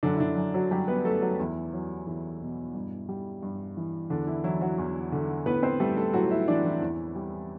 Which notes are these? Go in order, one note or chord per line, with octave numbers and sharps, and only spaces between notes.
F#2 D3 D4
E4
D3 D4
F#2
F#3 F#4
F#3 G3 G4
B3 B4
F#3 A3 A4
F#3 F#4
E2 E3 E4
F#3
E2
B2
G2
G3
G2
E3
E2 D3 D4
E3 E4
E3 F#3 E4
F#3 F#4
E2
D3
A2 B3 B4
C4 C5
G3 A3 A4
A3 A4
A2 F#3 F#4
E4 E5
E3 D4 D5
E3 E4
E2
G3